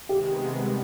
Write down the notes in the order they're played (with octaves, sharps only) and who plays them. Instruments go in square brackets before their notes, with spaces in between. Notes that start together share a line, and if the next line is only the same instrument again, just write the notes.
[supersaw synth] C3 D#3 G#3 B3 [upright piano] G4
[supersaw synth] G3